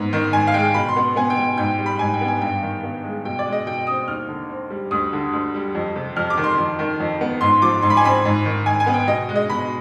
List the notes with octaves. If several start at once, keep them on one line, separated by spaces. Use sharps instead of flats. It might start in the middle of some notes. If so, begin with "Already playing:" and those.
Already playing: G#2 B3
D#3
G#2 G#5
F5
G#3 G5
B2 B5
C6
B3
B3 G#5
G5
B2
G#2 G5
G3
B5
G#2 G#5
G5
B3
G#5
G2 G5
D#3
B3
G#3
B2 G5
D5
G#3
D#5
B2 G5
C4 D#6
D#2 F6
D3
C4
G3
D2 D#6
D3
D2
G3
F2
C3
F2 F6
D6
D#3
C6
F2
D#3
F2
B3
G#2 C6
F3 D6
G#2 C6
B5
G#5
C4 B5
G#2
D#3
G#2 G#5
G#5
B3
G5
B2 D#5
G#3
D#5
B2 B5